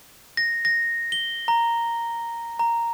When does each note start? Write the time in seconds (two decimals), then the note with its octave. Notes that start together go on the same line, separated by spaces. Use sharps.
0.37 A#6
0.65 A#6
1.12 G7
1.48 A#5
2.59 A#5